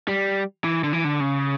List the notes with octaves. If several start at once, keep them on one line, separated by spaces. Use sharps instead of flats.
G3
E3
D3
E3
D3
C#3